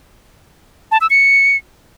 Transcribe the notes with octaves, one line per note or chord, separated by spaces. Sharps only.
A5
E6
C#7